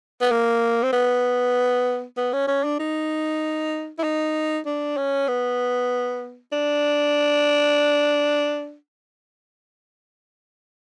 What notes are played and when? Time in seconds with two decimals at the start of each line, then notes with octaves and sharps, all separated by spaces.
0.21 B3
0.31 A#3
0.83 C4
0.93 B3
2.17 B3
2.33 C#4
2.48 C#4
2.64 D4
2.79 D#4
3.98 E4
4.03 D#4
4.66 D4
4.97 C#4
5.28 B3
6.52 D4